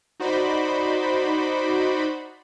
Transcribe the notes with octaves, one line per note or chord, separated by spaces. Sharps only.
D#4 F#4 C5 D5 B5